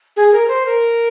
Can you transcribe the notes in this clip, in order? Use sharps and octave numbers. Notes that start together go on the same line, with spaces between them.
G#4
A#4
C5
A#4